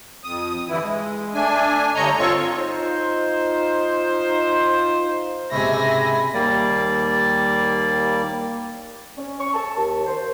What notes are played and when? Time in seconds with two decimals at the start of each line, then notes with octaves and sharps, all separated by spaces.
0.24 F2 D#6
0.69 G2 D3 E3 E4
0.82 G#3
1.34 A3 D4 G#5
1.95 G2 D3 C#5 D#5 A#5
2.19 C4 F4 A4 C#5 C#6
2.57 D#4 F4 C5
5.52 C#2 G#2 C3 E5 G#5 B5 A#6
6.34 D#2 G3 A#3 D5
9.17 C#4
9.39 C#6
9.53 A5
9.77 D#2
10.06 C5